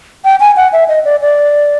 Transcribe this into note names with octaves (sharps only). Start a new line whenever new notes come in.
G5
G#5
F#5
E5
D#5
D5
D5